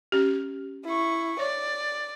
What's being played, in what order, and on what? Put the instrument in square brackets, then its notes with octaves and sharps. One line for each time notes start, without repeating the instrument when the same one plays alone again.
[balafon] C#4 G4
[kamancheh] E4 C#6
[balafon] C#5 [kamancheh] D5